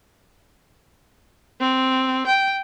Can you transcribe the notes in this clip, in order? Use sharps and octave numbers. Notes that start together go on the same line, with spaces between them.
C4
G5